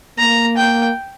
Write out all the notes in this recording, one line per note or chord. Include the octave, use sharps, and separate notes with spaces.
A#3 A#5
G5